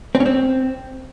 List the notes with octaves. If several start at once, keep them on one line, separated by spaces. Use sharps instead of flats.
C4
C#4
C4